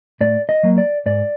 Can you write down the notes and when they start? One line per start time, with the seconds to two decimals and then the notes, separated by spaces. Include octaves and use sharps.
0.21 A2 D5
0.49 D#5
0.63 F#3 A#3
0.78 D5
1.06 G#2 D5